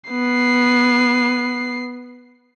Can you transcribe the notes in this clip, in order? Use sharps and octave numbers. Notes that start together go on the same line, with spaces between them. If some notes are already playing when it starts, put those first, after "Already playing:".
B3 C7